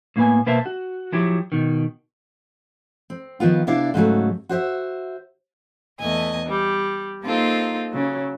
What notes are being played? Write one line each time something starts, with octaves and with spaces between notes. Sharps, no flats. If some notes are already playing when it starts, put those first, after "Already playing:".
A2 A#3 B3 B4 G#5
B2 A#3 B4 C5 E5 A5
F#4
F3 F#3 E4 G4
B2 D#3
C4
D#3 F3 B3 F4
C3 B3 D4 E4 D5 F5
G#2 C#3 F#3 A3
F#4 C5 D5 E5
E2 A3 D#5 G#5
G3
A#3 C4 D#4 F4 A4
C#3 F#3